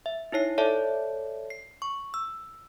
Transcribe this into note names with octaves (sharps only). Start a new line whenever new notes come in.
E5
D#4 E4 C#5 C7
A4 C#5 D5 E5 A5
C7
C#6
E6